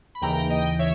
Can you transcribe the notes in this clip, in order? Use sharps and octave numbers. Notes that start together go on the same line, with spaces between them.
B5
D#2 C#3 E3 G5 A#5
D#5 G5
C#5 E5